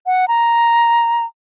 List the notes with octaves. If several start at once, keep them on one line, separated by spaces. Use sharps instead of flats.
F#5
A#5